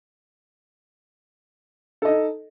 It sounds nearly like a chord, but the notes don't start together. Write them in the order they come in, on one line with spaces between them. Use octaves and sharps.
A4 D#5 D#4